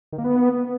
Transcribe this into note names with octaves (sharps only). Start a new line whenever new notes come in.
D#3
A#3
B3